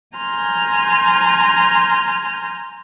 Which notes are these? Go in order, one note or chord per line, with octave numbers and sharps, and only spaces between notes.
G#5 A#5 C6 F6 G6